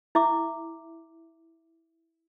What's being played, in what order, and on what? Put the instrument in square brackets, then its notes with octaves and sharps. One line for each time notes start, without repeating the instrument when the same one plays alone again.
[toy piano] E4 E5 D6